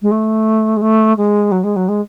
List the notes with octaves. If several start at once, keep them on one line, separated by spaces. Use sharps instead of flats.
G#3
A3
G#3
A3
G#3
F#3
G#3
F#3
G#3